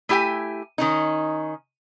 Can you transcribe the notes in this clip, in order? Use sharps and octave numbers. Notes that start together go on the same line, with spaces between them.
A3 E4 G4 G5 G#5
D#3 C#4 D#4